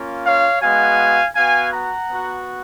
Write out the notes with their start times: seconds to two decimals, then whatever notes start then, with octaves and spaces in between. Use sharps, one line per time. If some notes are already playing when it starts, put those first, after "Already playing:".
Already playing: A#3 C#4 F4
0.26 C#5 F5
0.62 G#3 B3 F#4 F5 G#5
1.36 B3 F#4 F5 G#5
1.73 F#5 A#5
2.09 B3 F#4